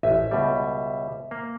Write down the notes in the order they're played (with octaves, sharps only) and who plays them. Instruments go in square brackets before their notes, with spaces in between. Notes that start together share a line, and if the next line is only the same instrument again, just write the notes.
[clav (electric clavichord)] A1 [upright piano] E5
[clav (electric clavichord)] C#2 B2 G3
A#3